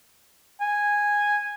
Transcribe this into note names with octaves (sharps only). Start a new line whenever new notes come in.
G#5